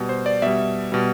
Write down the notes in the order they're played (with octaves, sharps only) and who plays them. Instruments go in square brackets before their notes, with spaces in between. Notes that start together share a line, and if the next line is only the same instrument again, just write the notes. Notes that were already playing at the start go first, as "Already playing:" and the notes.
Already playing: [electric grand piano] B2 G3
C5
D5
B2 G3 E5
B2 G3